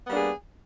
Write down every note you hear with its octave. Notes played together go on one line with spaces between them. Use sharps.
G3 A#3 B3 D4 G#4